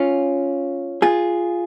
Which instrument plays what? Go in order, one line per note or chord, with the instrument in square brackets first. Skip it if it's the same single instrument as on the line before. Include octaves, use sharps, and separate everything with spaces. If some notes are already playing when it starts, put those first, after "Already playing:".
Already playing: [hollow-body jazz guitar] C#4 F4
F4 G#4